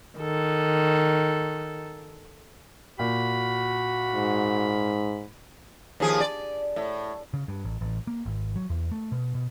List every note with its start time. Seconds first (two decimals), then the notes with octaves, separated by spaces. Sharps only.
0.19 D#3 A4
2.99 A#2 F#4 B5
4.14 G#2
6.00 D#2 F3 G#4
6.20 D5
6.76 A2
7.34 C#3
7.48 G2
7.65 A1
7.81 A1
8.07 A#3
8.26 G#1
8.56 F#3
8.70 E2
8.92 A3
9.12 B2
9.35 B2